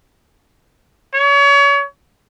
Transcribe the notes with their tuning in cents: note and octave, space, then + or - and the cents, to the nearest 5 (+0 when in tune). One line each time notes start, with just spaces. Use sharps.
C#5 +35